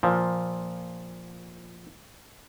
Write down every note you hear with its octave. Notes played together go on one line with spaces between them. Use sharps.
A#2 F3